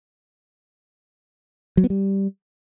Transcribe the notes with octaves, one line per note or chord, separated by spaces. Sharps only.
F#3
B3
G3